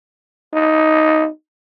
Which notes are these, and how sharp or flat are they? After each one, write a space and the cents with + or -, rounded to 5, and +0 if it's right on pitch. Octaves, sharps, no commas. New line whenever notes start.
D#4 +10